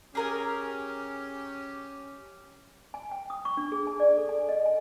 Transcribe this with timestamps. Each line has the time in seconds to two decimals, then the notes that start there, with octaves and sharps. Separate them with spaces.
0.15 C#4 G4 G#4 A#4 G#5
2.94 G#5
3.11 G5
3.30 D#6
3.45 C#6
3.57 D4
3.72 G#4
3.87 G#5
4.00 D5
4.17 A4
4.29 G#5
4.49 D#5
4.66 G#5